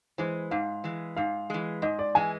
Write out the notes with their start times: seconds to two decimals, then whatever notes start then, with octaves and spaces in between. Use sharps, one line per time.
0.18 E3 G#3 C5
0.51 G#2 F5
0.84 E3 G#3
1.17 G#2 F5
1.50 E3 G#3
1.82 G#2 D#5
1.99 D5
2.15 E3 G#3 G#5